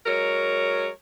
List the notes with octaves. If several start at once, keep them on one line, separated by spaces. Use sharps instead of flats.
F#3 G#3 A#4 C#5